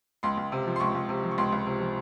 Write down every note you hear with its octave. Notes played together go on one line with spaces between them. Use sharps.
C#2 C6
C#2
C3
F3
C6
C#2 C#6
C#2
C3
F3
C#6
C#2 C6
C#2
C3
F3